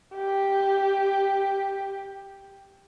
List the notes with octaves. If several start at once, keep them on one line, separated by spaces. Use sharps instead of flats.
G4